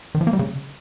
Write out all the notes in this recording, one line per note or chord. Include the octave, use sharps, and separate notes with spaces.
D#3
F3
A#3
G3
C#3